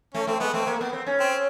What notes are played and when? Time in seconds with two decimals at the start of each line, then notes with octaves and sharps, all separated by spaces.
0.14 A3 C#4
0.27 A3 C4
0.40 G#3 B3
0.53 A3 C4
0.67 A#3
0.81 B3
0.93 C4
1.07 C#4
1.20 C4